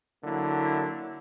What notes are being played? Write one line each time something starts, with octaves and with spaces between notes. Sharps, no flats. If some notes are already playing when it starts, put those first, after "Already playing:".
D3 F#3 A#3 E4